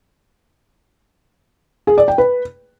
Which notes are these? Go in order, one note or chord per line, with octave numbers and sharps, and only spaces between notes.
G#4
D5
G5
B4